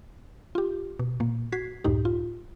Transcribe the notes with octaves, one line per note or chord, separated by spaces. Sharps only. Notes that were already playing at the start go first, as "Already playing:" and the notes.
F4 G4
B2
A#2 A#3
F#4 G#6 B6 C7
C#2 F#2 A2 D#4 G4
F4